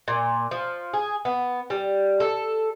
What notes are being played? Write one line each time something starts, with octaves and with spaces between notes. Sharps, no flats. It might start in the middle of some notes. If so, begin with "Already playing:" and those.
A#2
F3
G#4
B3
G3
A4